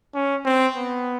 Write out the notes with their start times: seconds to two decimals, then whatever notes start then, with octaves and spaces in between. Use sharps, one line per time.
0.15 C#4
0.46 C4
0.76 B3